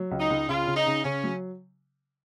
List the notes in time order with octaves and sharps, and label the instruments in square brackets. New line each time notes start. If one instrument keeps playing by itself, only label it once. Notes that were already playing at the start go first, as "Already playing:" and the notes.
Already playing: [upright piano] F#3
C#2
[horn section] D#4
[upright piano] C#2
[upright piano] C#3 [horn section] F4
[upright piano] C#3
[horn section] D#4
[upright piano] C#3
[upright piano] C#3 [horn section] C#4
[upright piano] F#3